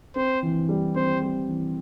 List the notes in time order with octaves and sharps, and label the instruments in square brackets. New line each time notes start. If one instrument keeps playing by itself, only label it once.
[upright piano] C4 [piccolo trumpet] C5
[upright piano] E3
G3
[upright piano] C4 [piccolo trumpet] C5
[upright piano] G3
E3